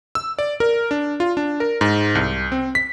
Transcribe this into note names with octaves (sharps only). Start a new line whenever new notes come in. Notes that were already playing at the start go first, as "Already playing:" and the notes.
E6
D5
A#4
D4
F4
D4
A#4
G#2
C2
C4
B6